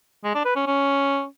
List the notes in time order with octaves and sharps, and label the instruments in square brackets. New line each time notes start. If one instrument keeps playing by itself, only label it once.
[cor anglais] G#3
D4
B4
C#4
C#4